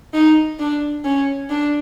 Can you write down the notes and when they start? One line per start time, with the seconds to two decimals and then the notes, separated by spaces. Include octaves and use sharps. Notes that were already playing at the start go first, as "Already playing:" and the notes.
0.14 D#4
0.60 D4
1.05 C#4
1.50 D4